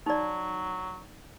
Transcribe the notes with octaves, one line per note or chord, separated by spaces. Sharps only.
F#3 D#4 D5